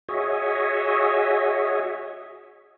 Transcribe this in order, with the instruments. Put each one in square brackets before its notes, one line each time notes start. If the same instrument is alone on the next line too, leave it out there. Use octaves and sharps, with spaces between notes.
[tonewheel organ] F#4 G#4 C#5 D#5 E5